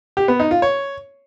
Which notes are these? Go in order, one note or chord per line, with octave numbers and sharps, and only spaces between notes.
G4
B3
D#4
F4
C#5